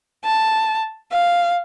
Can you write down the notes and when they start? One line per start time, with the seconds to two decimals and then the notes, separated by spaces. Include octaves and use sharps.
0.24 A5
1.12 F5